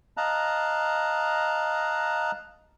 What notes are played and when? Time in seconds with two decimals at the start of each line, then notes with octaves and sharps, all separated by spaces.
0.17 D#5 F5 A5 A#5 F#6